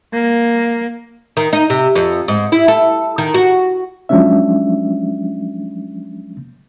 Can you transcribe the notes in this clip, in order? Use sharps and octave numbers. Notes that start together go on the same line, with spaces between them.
A#3
D#3
D#4
C3
F2
G#2
E4
A4
D#3
F#4
F3 F#3 G#3 C#4 D4 E5